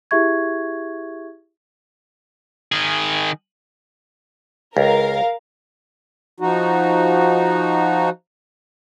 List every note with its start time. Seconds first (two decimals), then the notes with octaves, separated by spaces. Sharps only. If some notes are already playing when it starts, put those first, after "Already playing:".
0.11 E4 G4 G#4 E5 C#6 G#6
2.72 D#3 G#4
4.77 C#2 A#4 F5
6.40 F3 D#4 F#4